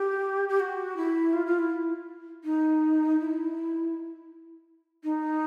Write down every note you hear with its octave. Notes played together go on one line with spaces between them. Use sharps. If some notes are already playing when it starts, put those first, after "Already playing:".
Already playing: G4
G4
F#4
E4
F4
F4
E4
D#4
E4
D#4